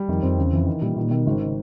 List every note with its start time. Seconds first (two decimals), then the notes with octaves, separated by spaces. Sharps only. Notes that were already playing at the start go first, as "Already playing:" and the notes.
Already playing: G3
0.09 F2 D#3
0.23 F2 C4
0.38 E2 C#3
0.53 F2 E3
0.67 D#3
0.82 A#2 G3
0.97 A#2 D#3
1.11 B2 D#3
1.26 G#1 C#3
1.41 C#3